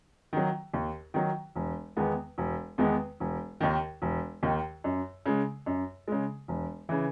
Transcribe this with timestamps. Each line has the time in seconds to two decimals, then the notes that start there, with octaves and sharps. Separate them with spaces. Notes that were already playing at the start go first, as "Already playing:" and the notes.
0.33 D#3 F#3
0.73 D#2
1.14 D#3 F#3
1.56 E1
1.97 E2 D#3 G#3 B3
2.38 E1
2.78 E2 D#3 G#3 B3
3.20 E1
3.61 D#2 D#3
4.02 E1
4.43 D#2 D#3
4.84 F#2
5.26 C#3 G#3
5.66 F#2
6.08 C#3 G#3
6.48 E1
6.89 C#3 E3